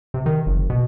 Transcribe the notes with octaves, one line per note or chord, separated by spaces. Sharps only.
C3
D#3
F#1
B2